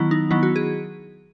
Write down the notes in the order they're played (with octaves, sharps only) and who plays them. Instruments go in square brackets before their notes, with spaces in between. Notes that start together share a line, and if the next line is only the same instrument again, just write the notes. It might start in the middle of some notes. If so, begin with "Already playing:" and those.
Already playing: [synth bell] D#3 F#3 B3 E4
D#4
D#3 F#3 B3 E4
F#4
G#4